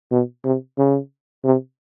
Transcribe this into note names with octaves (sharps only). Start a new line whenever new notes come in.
B2
C3
C#3
C3